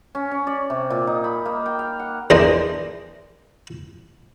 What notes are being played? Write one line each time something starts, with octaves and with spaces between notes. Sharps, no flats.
C#4
C#4
D5
C3
A#2
D#4
B5
A#3
G5
F5
F#5
E2 E3 D4 A#4 C5 D#5